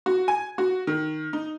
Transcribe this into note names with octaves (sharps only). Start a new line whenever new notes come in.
F#4
G#5
F#4
D#3
D#4